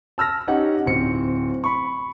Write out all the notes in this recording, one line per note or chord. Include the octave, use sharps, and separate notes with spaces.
A5 E6 F6 A#6
C#4 D#4 G4 F#5
D1 C4 C#7
B5 C#6